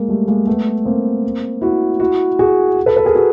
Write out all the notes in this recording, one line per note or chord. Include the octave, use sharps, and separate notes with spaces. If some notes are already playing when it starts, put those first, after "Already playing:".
Already playing: G#3 A#3
G3 A3
G#3 A#3
A3 B3
A#3 C4
E4 F#4
E4 F#4
F#4 G#4
A4 B4
A4 B4
G#4 A#4
F#4 G#4